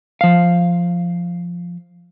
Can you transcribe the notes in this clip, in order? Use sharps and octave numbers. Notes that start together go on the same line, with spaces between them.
F3 F5